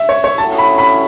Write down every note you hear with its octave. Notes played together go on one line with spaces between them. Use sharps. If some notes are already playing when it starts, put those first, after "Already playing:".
Already playing: E5
C#5
C#5
A2 F#3 C#4 A5
B5
B5